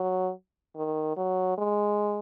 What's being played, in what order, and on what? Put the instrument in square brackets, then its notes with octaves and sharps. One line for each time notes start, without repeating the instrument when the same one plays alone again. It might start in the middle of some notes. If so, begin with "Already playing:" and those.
Already playing: [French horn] F#3
D#3
F#3
G#3